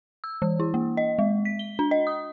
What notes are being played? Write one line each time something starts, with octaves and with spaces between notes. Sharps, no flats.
E6
E3
E4
A#3
D#5
G#3
B6
G7
D4
D#5
D#6